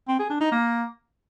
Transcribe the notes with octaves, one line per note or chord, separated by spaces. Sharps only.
C4
G#4
D4
D#4
A#3